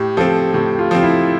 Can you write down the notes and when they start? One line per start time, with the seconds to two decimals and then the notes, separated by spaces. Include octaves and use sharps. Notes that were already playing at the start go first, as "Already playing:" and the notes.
Already playing: A2 G4
0.17 F3 C4 A4
0.53 A2 G4
0.79 F4
0.91 F3 C4
1.03 E4